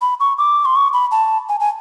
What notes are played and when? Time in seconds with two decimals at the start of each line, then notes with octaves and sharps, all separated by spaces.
0.01 B5
0.20 C#6
0.38 D6
0.65 C6
0.76 C#6
0.93 B5
1.11 A5
1.49 G#5
1.60 G#5